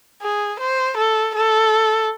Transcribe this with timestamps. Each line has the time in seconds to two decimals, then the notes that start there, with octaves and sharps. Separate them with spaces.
0.22 G#4
0.60 C5
0.97 A4
1.35 A4